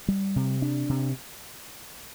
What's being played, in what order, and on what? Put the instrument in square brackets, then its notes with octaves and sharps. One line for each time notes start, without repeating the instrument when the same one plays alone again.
[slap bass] G3
C3
D4
C3